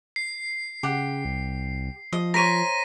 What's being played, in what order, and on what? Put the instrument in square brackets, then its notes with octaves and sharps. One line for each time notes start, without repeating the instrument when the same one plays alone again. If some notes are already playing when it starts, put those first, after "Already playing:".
[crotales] C7
[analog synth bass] C#3 [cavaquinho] G4 F#5
[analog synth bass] C2
[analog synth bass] F3 [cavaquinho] D#5
[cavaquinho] A#4 C5 C#5 [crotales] A#6 B6 D#7